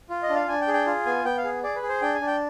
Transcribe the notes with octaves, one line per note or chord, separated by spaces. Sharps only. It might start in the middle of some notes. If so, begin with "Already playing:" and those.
F4
D#5
D4
F5
D4 G#5
G5
G#4
G5
F4
B3 G#5
B3 G5
F5
G#4
G#4 D5
B4
G#4
C5
D4 G5
G#5
D4
G5